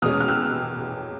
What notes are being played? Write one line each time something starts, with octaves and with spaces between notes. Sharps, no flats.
E2 B2 G#3 C#4 D#6 F6
F6
E6 F#6